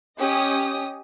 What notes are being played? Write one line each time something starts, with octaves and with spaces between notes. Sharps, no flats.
C#4 G4 D#5 D#6